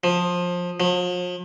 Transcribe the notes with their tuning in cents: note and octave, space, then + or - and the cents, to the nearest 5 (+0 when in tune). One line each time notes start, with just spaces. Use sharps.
F3 +20
F3 +45